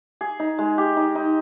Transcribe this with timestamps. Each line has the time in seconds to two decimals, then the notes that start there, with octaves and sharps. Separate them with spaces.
0.21 G#4
0.39 D#4
0.58 G#3
0.78 G4
0.97 D#4
1.15 D#4